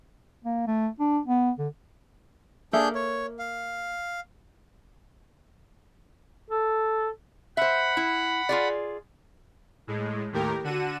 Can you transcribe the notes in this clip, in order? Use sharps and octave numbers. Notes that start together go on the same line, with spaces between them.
A#3
A3
D4
B3
D3
A#3 D4 G#4 A4 E5 G6
C#5
F5
A4
C5 E5 F#5 B5
E4
F4 G#4 D5
A2 G#3
D#2 A2 G4 A#4
D3 F#4 D#7 E7